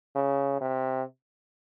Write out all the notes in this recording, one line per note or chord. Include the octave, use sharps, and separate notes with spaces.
C#3
C3